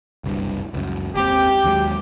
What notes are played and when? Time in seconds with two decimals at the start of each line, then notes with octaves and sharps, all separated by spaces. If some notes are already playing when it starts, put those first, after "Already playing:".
0.24 F#1 C2 G2
0.74 C#2 F#2
1.15 G#1 D#2 C4 G4
1.64 D#2 F#3 G#3